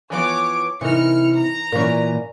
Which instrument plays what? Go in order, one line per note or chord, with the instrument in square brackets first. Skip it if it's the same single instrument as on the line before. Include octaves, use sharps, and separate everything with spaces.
[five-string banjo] E3 F3 B3 [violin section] C#5 D6
[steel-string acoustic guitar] C3 [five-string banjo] E3 D#4 A#4 [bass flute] E4 [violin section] F6 C#7
[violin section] A#5
[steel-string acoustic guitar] A#2 E3 [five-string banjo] C#4 A#4 [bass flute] D5